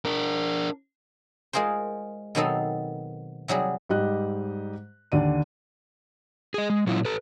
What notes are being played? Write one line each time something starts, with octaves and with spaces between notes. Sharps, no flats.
D4 A#4
G#3 F4 G#4 A#4 C5
B2 D#3 F#3 C4 D#4 A4
C3 F#3 G3 G#4
G#2 G3 G4 D#5 F#6
D#2 D3 D5 D#7
G#4 D#5
G#3
A#2 F#3 C#4 E4 F4
A4 B4